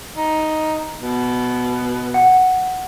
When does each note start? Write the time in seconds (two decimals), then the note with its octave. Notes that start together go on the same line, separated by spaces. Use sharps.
0.16 D#4
1.02 B2
2.14 F#5